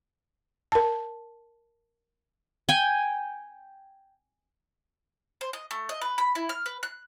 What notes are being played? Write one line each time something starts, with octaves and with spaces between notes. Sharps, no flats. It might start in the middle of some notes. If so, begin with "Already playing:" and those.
A#4 A5
G5 G#5
C5
D#5
A3
D#5
B4
B5
E4
F6
B4
F#6